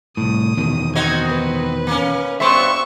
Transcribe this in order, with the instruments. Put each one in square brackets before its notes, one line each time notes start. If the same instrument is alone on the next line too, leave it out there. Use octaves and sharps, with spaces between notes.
[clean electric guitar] C2 A2 [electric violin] D#6
[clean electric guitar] E2 B2 D#3
[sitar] C4 D#4 F#4 [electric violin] G#6
[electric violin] B4
[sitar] A#3 C#4
[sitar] G2 B3 C5 [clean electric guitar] E5 C6 [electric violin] C#6 E6